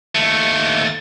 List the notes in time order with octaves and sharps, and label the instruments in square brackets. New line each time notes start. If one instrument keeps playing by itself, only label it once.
[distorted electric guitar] D#2 A3